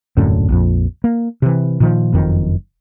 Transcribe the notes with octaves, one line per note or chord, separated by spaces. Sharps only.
D#1 F#2 A2 D3
A#1 F2
A#3
C3 E3
A#2 D#3 F3
F#1 F2 D#3